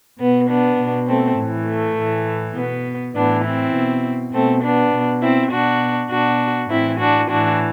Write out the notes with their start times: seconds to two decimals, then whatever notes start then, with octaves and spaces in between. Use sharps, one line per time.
0.20 B2 B3
0.50 B3 D4
0.80 B2
1.08 A3 C4
1.38 A2 E3
1.68 A3
1.97 A2 E3
2.56 B2 B3
3.16 A2 E3 B3 D4
3.45 C4 E4
3.75 B2
4.34 B2 A3 C4
4.64 B3 D4
4.93 B2
5.23 C4 E4
5.52 B2 D4 F#4
6.11 B2 D4 F#4
6.70 A2 E3 C4 E4
7.00 D4 F#4
7.30 A2 E3 D4 F#4